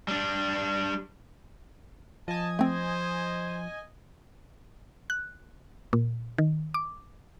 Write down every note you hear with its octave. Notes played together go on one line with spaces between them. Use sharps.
G3 D4
F3 D#5 G#5 A5
A3 C4 C5
F#6
A#2
D#3
D6